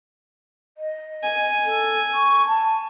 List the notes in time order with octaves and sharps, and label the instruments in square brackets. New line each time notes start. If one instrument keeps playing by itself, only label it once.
[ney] D#5
[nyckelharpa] G#5
[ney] A4
C#6
A5